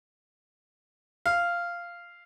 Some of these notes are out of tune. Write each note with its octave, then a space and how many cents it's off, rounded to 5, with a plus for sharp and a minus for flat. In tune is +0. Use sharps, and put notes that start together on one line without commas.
F5 -10